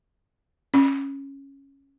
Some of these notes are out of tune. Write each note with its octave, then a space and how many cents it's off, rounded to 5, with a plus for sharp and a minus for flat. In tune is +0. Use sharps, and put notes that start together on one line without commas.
C#4 -10